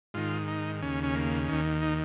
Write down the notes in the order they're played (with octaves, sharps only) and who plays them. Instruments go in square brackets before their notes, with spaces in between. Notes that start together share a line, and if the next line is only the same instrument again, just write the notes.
[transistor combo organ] G#2 D#3 F4
D#4
D#2 C#3 C#4
C#4
A#3
D#2 D#3 C#4
D#4